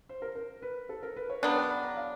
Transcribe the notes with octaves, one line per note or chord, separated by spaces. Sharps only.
C5
A#4
A#4
B4
A4
A#4
B4
C#5
C#3 F#3 B3 D4 G5
G5
B5
A#5
F5